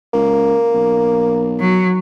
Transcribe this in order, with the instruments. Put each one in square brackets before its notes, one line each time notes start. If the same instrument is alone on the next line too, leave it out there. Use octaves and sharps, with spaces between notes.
[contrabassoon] C#2 [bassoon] A#3
[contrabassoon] B1
[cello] F#3